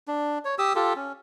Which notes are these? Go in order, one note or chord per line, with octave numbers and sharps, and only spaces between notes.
D4
C#5
G4 D#6 E6
F4 G4 A4
C#4